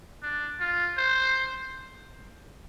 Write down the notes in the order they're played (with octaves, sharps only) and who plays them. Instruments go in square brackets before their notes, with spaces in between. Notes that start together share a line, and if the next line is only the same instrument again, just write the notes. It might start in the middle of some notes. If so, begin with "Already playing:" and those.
[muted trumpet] D4
F4
C5